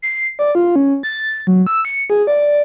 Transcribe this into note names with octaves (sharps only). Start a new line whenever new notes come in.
C7
D5
F4
C#4
A6
F#3
E6
C#7
G#4
D5